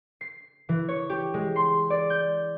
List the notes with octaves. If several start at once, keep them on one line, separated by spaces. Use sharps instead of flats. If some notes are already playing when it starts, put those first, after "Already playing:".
C7
E3
C#5
G4
G#3
C6
D5
G6